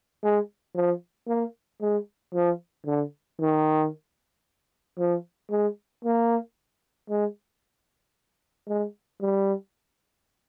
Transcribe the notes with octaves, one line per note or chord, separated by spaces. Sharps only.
G#3
F3
A#3
G#3
F3
D3
D#3
F3
G#3
A#3
G#3
G#3
G3